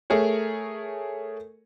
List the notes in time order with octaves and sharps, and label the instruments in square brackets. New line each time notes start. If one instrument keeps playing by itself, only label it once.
[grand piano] A3 G#4 A#4 C#5